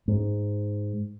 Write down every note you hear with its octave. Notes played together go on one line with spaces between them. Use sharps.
G#2